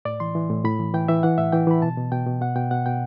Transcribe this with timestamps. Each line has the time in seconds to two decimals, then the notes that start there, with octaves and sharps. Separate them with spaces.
0.05 A2 D5
0.20 E3 C6
0.35 E3
0.50 A2
0.64 A2 B5
0.79 E3
0.94 E3 G5
1.08 E3 E5
1.23 E3 F#5
1.38 A2 E5
1.53 E3 G5
1.67 E3 B5
1.82 B2 A5
1.97 B2
2.11 B2 G5
2.27 B2
2.41 B2 F#5
2.56 B2 G5
2.71 B2 F#5
2.86 B2 G5